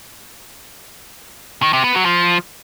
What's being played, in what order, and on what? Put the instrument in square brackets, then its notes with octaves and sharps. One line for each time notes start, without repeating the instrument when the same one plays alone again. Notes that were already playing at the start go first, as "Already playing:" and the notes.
[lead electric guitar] D#3
C3
B3
F#3
F3